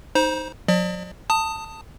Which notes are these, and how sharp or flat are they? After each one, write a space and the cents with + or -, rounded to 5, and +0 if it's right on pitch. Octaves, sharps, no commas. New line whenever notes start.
D#4 +0 C5 +0 A#5 +40
F#3 -45 D5 +40
A5 +20 D#6 +0